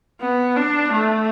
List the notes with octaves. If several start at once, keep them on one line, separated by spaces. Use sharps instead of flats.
B3
D4
A3